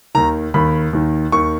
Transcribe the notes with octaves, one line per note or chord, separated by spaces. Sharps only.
D#2 D#3 A#5
D#2 D#3 B5
D#2 D#3
D#2 D#3 C#6